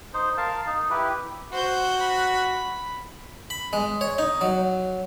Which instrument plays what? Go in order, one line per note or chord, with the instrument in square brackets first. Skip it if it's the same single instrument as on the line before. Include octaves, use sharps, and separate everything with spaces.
[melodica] D#4 C5
A#4 F5 A5
D#4
E4 G4 B4
[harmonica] F#4 [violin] C5 G6
[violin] B5
[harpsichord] B5
G#3
C#5
D#4
F#3